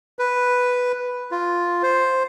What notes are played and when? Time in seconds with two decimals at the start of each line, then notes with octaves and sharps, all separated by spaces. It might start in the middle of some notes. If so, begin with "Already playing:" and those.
0.19 B4
1.31 F4
1.83 C5